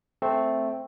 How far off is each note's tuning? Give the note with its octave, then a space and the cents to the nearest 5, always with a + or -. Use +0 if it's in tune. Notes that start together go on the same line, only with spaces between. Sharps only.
A3 +0 C4 +0